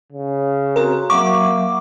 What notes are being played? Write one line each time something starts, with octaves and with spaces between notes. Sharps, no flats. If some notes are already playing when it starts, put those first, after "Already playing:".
C#3
C4 F#4 A#4 A#5
F#3 A#3 E5 F#5 C#6 D6